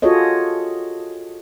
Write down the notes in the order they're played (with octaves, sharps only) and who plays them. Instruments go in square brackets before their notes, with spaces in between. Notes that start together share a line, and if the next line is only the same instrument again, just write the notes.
[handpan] F4 F#4 G#4 A4 C#5 D#5